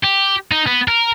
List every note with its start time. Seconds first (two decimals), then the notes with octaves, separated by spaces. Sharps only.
0.03 G4
0.51 D#4
0.67 B3
0.88 A#4